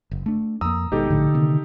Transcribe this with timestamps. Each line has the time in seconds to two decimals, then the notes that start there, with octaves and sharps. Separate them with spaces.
0.11 F#1
0.26 A3 D4
0.61 F2 A#3 A#5 D#6 E6
0.92 G#1 G#2 B2 D#4 G4 A4
1.10 A#1 A2 D3
1.34 C3 D#3 A#3